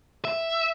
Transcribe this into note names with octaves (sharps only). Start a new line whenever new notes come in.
E5